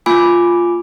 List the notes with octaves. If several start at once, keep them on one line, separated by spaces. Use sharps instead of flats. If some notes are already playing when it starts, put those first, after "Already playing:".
A#3 F4 G#5 B5 D6